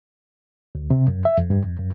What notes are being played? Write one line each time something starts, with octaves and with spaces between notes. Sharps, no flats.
D2
C3
F#2
E5
F2
G2
F2
F#2